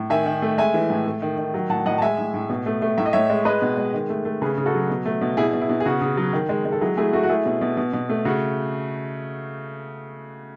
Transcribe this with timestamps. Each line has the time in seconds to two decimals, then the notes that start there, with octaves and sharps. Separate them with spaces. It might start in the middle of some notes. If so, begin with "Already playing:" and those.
Already playing: A2
0.10 D#3 E5 G#5
0.26 D#3
0.42 A3
0.58 G#3 E5 G#5
0.74 E3
0.90 A2
1.06 A3
1.22 D#3
1.38 D#3
1.54 F#3
1.70 A2 F#5 A5
1.86 A2 D#5 F#5
1.98 A5
2.02 G#3 E5 G#5
2.18 A2
2.34 A2
2.50 B2
2.66 A3
2.82 A3
2.98 A2 E5
3.06 D#5
3.13 A2 C#5 E5
3.30 G#3
3.45 G#3 B4 D#5
3.62 B2
3.77 G#3
3.94 D#3
4.10 A3
4.25 A3
4.42 C#3 G#4 B4
4.58 C#3
4.66 F#4 A4
4.74 F#3
4.90 B2
5.06 A3
5.22 B2
5.37 B2 E4 G#4
5.53 B2
5.61 E4
5.69 B2
5.80 G#4
5.86 C#3 F#4
6.01 C#3
6.17 F#3
6.33 D#3
6.49 G#3
6.65 G#3
6.72 A4
6.81 F#3 E4 G#4
6.97 A3 E4 G#4
7.13 A3 F#4
7.23 F#4
7.29 A3 E4 G#4
7.46 B2
7.61 B2
7.77 B2
7.93 B2
8.09 A3
8.25 C#3 F#4